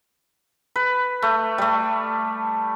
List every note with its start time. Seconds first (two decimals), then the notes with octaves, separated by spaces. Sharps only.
0.76 B4
1.22 A3
1.58 G3 A3